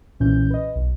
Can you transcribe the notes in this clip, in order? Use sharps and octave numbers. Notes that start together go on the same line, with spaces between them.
B1 A#2 E3 C#4 G6
B4 D#5
B1